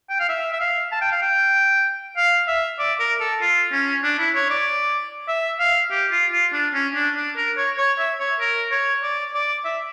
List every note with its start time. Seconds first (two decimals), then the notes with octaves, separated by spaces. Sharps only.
0.10 G5
0.20 F5
0.29 E5
0.53 E5
0.61 F5
0.92 A5
1.02 G5
1.12 F5
1.22 G5
2.17 F5
2.48 E5
2.79 D5
3.00 A#4
3.21 A4
3.41 F4
3.72 C#4
4.04 D4
4.19 E4
4.35 C#5
4.50 D5
5.28 E5
5.60 F5
5.91 G4
6.12 F4
6.33 F4
6.53 D4
6.74 C#4
6.95 D4
7.16 D4
7.37 A#4
7.57 C#5
7.78 C#5
7.99 E5
8.20 C#5
8.40 A#4
8.72 C#5
9.03 D5
9.34 D5
9.65 E5